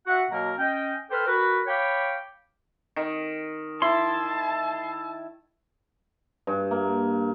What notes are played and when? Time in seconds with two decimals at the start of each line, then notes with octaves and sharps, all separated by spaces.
0.06 F#4 E5 F#5
0.30 B2 F#3 A#3 A#4
0.58 C#4 D#5 G5
1.11 A4 B4 C5 G5 F6
1.27 F#4 A#4 B4
1.66 C#5 F5 G5 B5 D6
2.96 D#3
3.82 E4 A5 C6
6.47 G2
6.71 A#3